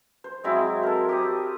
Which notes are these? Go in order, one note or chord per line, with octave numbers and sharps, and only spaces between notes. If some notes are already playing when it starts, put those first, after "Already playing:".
C5
F#3 G#3 C4 E4
A4 A#4
G4 C5 D#6